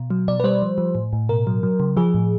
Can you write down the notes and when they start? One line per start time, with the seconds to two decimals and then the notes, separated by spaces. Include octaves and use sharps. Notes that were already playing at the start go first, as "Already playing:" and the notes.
Already playing: B2
0.10 F#3
0.28 B2 D5
0.40 B4
0.44 G3 C5
0.62 F3
0.78 F3
0.95 A2
1.13 A2
1.29 B2 A#4
1.47 F#3
1.63 F#3
1.80 C#3
1.97 F3 G#4
2.14 A2